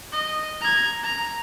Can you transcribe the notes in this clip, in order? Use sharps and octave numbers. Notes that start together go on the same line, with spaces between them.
D#5
A#5 G#6
A#5